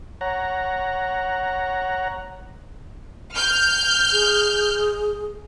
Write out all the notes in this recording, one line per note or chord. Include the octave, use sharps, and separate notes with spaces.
C#5 F#5 A#5
F6 G6
G#4